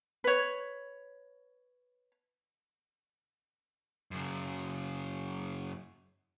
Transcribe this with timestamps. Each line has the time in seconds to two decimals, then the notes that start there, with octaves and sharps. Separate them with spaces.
0.24 B4 C#5
4.11 F#2 C#3